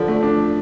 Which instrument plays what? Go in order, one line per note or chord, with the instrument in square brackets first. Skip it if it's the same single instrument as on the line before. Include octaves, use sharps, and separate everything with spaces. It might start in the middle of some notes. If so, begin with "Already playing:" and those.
Already playing: [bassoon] D3 [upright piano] F3
[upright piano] A3
D4